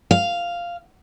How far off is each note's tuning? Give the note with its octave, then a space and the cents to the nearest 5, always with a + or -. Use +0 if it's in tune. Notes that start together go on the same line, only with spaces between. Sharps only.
F5 -5